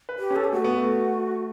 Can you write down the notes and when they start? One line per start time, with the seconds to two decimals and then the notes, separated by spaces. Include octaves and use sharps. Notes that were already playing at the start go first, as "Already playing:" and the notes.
0.09 B4
0.19 G4
0.31 C#4
0.36 A4
0.44 G4
0.52 A3 F#4
0.64 B3
0.77 A3